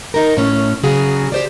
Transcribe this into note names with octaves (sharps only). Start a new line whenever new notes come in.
D#4 A#4
A2 C#4
C#3 F#3 F#4 G#4
G4 C5 D5